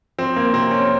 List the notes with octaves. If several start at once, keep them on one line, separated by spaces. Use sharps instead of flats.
F3 C4
A#3
C3 C4
C#4